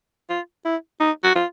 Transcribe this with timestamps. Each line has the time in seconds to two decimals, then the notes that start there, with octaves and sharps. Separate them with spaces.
0.30 F4
0.65 E4
1.00 D#4
1.24 F#4
1.35 F4